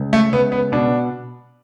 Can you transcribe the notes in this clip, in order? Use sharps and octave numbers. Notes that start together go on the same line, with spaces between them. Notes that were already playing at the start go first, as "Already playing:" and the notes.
Already playing: C#2
A3
C#2 B3
B3
B2 D4